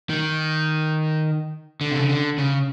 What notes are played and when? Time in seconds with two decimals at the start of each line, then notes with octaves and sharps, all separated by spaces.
0.09 D#3
1.81 D3
1.91 C3
2.00 C#3
2.09 D3
2.38 C#3